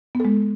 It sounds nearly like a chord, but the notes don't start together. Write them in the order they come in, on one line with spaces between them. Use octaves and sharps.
B3 A4 G#3